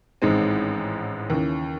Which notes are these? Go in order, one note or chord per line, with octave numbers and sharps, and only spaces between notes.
A1 G#2 D#3 G#3 C4
D#2 C#3 E3